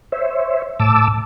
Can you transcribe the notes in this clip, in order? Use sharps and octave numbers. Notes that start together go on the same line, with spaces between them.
C5 C#5 E5
A2 A5 D6 E6